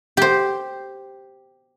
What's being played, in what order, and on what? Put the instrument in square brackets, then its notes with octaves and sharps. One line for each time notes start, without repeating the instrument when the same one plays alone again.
[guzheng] G4 C5